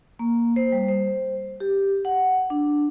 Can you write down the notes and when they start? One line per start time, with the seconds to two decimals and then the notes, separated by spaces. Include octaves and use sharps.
0.19 A#3
0.56 C5
0.72 G3
0.88 C5
1.60 G4
2.05 F#5
2.50 D4